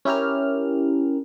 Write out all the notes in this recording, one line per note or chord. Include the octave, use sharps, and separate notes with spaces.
C#4 E4 G4 A#4 F6